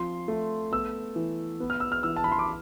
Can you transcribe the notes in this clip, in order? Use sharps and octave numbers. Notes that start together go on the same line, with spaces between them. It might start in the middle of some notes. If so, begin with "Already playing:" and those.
Already playing: F3 C4 C6
A3
B3 E6
E3
B3
F6
E6
F6
E3 E6
A5
B5
C6
D6